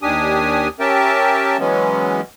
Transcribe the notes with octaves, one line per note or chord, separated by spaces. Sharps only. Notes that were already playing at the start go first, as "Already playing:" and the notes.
D#2 D#3 D4 G4 G#5 D#6
C#4 G4 A#4 E5 G5 A5
E3 F#3 G#3 B3 C#4